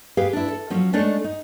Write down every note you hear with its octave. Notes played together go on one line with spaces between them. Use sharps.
G4 G#4 B4 F5
D4 E4
A4
F3 F#3 C#4 F4
G#3 A3 D4 D#4 C#5
D#4